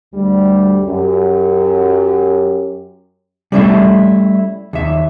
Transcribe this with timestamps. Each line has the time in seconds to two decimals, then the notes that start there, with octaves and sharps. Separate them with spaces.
0.14 D2 G3
0.85 F#2 G4
3.52 G3 A3 C#4 E4 A4 E5
4.73 D#2 E5